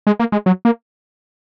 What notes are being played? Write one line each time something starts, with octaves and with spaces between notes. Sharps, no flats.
G#3
A#3
G#3
F#3
A#3